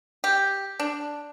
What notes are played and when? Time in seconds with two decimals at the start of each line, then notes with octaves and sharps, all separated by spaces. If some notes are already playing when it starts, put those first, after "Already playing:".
0.24 G4
0.80 D4